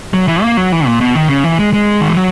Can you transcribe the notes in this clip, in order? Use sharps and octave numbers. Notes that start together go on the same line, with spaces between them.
F#3
E3
A#3
F#3
E3
A#2
B2
D#3
C#3
E3
G#3
G#3
D#3
E3
F#3